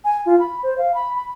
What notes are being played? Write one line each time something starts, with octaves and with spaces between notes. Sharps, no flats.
G#5
F4
B5
C5
F5
B5
B5